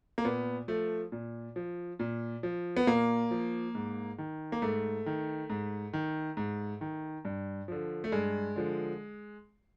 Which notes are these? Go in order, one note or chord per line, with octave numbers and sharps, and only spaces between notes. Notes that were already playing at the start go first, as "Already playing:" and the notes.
A#3
A#2 B3
F3 A3
A#2
F3
A#2
F3
B3
A#2 A#3
F3
G#2
D#3
A#3
G#2 A3
D#3
G#2
D#3
G#2
D#3
G2
D3 F3
A3
G2 G#3
D3 F3